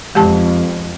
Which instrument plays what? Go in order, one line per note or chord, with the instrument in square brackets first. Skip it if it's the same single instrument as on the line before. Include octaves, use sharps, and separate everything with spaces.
[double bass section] F2 [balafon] G#3 G4 A5